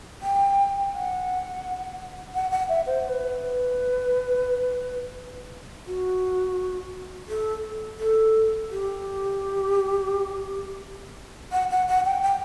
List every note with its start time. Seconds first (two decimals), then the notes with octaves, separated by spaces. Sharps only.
0.22 G5
0.93 F#5
2.35 F#5
2.51 F#5
2.69 E5
2.86 C5
3.04 C5
3.08 B4
5.87 F#4
7.28 A4
7.99 A4
8.70 G4
11.52 F#5
11.70 F#5
11.88 F#5
12.05 G5
12.23 G5